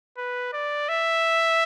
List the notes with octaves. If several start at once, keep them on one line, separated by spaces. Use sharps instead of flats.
B4
D5
E5